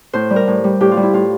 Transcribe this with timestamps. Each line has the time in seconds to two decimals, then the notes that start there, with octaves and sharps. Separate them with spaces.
0.13 A2 C5
0.30 G3
0.36 A#4
0.47 A2
0.64 G3
0.80 A2 G4
0.92 F4
0.97 G3
1.03 E4
1.13 A2 F4